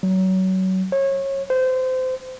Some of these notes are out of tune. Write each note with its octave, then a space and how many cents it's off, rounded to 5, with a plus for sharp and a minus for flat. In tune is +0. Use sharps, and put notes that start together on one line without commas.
F#3 +25
C#5 -25
C5 -25